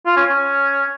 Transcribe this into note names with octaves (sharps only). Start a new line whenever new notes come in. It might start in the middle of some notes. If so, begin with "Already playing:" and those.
F4
C#4
C#4